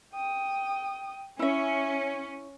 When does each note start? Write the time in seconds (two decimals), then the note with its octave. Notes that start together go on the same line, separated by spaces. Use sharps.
0.13 G5 D#6
1.39 C#4 E4 E5 G#5